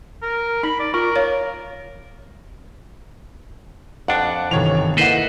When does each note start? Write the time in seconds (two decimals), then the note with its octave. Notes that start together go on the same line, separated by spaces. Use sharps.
0.22 A#4
0.63 D#4 B5
0.79 D5
0.94 F4 A#4
1.16 C#5 F5
4.08 F2 D4 F#5 A5 F#6
4.51 G1 C3 D#3 E3 C#5 F7
4.97 A#3 E4 A4 B4 C5 D#5 F#5 A#6